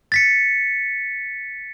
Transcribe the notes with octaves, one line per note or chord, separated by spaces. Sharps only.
A6 B6 C#7